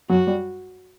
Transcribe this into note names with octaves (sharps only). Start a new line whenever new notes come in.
F#2 F#3 F#4
G3